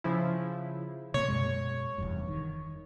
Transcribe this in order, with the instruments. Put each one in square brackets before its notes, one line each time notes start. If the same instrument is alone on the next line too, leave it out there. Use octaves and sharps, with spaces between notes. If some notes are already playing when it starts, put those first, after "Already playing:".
[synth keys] C#3 F3 E4
[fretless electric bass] C3 A#3 [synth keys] C#5
[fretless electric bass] F#2 B2 G#3
F1 E2 G2
D#3